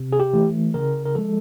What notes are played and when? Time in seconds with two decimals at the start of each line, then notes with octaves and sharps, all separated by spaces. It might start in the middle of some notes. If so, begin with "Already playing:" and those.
Already playing: C3
0.13 G#4
0.20 G4
0.34 E3 A3
0.74 C#3 A#4
1.06 A#4
1.15 F3 G#3 A4